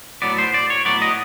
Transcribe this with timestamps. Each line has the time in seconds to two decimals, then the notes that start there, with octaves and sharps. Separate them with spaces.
0.22 A2 F#3 B3 D5
0.38 C5
0.54 D5
0.70 C#5
0.85 A2 F#3 B3 D5
1.02 D#5